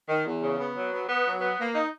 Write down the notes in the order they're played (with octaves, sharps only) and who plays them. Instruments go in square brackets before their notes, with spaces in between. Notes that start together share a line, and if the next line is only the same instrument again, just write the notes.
[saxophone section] D#3
E2
C#3
B3
F#3
B3
B3
F#3
B3
A#3
D#4